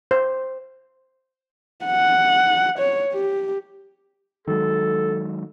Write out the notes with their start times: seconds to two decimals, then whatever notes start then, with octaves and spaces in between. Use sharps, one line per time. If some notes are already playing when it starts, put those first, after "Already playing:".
0.11 C5
1.85 F#5
2.79 C#5
3.14 G4
4.47 D#3 F#3 G#3 A4